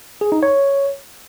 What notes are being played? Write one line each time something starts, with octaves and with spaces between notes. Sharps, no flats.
G#4
D#4
C#5